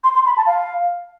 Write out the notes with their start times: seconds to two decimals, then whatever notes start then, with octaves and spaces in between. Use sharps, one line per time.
0.04 C6
0.15 C6
0.26 B5
0.37 A5
0.47 F5